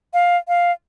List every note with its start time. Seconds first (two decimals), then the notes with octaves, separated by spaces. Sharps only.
0.14 F5
0.48 F5